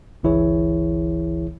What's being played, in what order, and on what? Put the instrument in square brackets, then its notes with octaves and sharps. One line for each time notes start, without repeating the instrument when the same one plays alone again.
[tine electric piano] G1 C#2 E3 E4 G#4 C#5